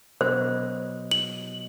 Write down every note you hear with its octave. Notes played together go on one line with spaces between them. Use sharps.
B2 F#3 C5 D#5
F#7